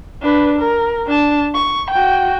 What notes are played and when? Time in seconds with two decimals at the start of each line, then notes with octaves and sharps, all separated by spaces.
0.21 D4 B4
0.58 A#4
1.07 D4 A5
1.54 C#6
1.91 F#4 G5